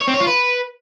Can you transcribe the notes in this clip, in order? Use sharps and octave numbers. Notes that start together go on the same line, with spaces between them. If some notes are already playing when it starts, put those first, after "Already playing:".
C#5
C4
C#5
F4
B4